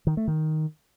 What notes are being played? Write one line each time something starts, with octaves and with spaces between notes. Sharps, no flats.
D#3
A3
D#3